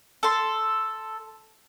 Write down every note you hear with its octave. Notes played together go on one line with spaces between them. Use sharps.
A4 C6